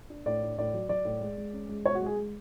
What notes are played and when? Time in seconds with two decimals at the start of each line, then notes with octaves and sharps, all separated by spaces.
0.10 D4
0.26 A2 D5
0.42 D4
0.58 A2 D5
0.74 F#3
0.89 F#3 D5
1.05 A2
1.21 G#3
1.38 G#3
1.53 C#4
1.69 G#3
1.85 B2 C#5
1.95 F#4
2.01 G#3
2.06 G#4
2.16 G#3